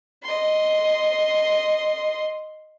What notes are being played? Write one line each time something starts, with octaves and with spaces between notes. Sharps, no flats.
D#5 C6